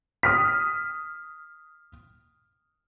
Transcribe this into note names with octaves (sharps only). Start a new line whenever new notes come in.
D#6 F6 B6